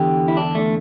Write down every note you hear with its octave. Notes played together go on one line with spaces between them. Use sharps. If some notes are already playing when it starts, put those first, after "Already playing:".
Already playing: E2 D3 G4
E4
D4
A3